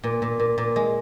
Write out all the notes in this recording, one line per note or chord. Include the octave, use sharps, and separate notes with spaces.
A#2
A#2
A#2
A#2
G#3